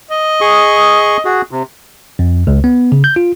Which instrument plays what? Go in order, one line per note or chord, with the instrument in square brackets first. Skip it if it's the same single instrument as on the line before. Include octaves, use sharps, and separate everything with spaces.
[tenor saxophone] D#5
[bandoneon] G#4 C#6
F#4 G#4
C3
[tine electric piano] F2
C#2
B3
C#3
G6
F4